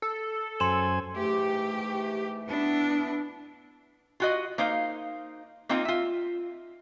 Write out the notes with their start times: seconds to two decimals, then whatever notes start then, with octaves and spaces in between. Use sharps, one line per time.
0.02 A4
0.60 F#2 C5 G#5 C6 E7
1.17 G#2 E3 A3 G4
2.49 B3 D4 E4
4.20 F4 F#4 D#5
4.58 A#3 D#4 C5 F5
5.69 A#3 C4 D#4 F4
5.85 F4 E5